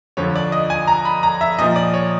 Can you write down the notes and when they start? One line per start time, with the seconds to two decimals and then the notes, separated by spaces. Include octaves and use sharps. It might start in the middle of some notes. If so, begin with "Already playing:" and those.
0.17 F2 D3 F3 C#5
0.36 D5
0.52 D#5
0.70 G#5
0.87 A#5
1.05 B5
1.23 A#5
1.41 E5
1.59 A#2 F3 D#5
1.76 D5
1.94 C#5